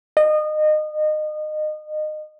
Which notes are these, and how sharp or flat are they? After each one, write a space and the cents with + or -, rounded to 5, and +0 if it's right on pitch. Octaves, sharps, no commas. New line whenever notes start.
D#5 -25